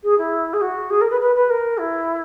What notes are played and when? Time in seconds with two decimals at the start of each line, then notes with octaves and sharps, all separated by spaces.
0.03 G#4
0.18 E4
0.53 G#4
0.61 F#4
0.90 G#4
1.01 A#4
1.10 B4
1.20 B4
1.35 B4
1.49 A#4
1.78 E4